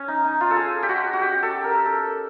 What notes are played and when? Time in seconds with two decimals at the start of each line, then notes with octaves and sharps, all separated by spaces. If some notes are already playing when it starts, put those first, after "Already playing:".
Already playing: C#4
0.08 D#4
0.24 D#4
0.41 F4
0.51 A4
0.56 G#4
0.83 G4
0.89 F#4
1.13 F#4
1.21 G4
1.43 A4
1.64 A#4
1.86 A4